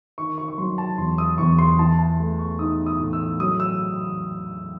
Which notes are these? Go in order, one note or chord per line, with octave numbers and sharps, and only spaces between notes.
D#3 C#6
C#6
C#6
F#3 C6
A5
E2 C6
D#6
E2 C#6
C6
E3 A5
A5
A3
C#6
D#4 D#6
D#6
A2
E6
F#3 D#6
E6